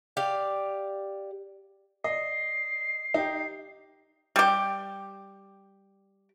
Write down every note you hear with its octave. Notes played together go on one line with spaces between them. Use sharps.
G4 D5 F5
D5 D#5 C7
D#4 G4
G3 G4